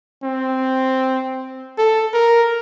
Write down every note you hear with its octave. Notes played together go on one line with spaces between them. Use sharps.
C4
A4
A#4